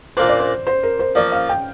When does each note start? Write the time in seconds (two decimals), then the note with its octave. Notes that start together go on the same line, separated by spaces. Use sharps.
0.17 A#2 A#3 D4 C5
0.29 D5
0.40 C5
0.67 C5
0.83 A#4
0.99 C5
1.15 F3 A#3 F4 D5
1.32 F5
1.49 G5